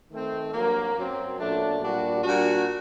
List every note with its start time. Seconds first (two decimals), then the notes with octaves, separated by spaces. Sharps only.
0.11 D#3 A3 C4
0.53 G2 F#3 A#3
0.96 F#2 F#3 C4
1.39 A#2 F#3 A3 D4
1.81 A#2 G3 D4 F#4
2.23 A#2 G3 D4 F#4